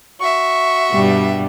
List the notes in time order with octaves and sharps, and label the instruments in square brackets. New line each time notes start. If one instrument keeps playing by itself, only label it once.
[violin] F#4 E5 [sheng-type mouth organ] C#6
[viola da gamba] G2 B2 G3